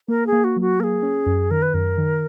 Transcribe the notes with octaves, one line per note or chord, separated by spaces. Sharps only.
A#3 A#4
G#4
A#3
F#4
F#3 F#4
A#3 G#4 A#4
C#4
F#2
D#3 A#4
B4
F#2 A#4
D#3